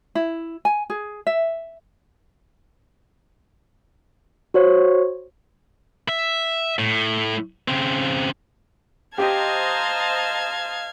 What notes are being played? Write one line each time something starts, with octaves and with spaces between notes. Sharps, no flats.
E4
G#5
G#4
E5
F#4 C5 C#5
E5
A2
C#3 C4
G4 C5 D#5 F5 A5 A#5 G#6